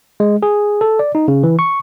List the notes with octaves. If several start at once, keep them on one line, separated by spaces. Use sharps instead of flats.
G#3
G#4
A4
D5
D#4
C#3
E3
C#6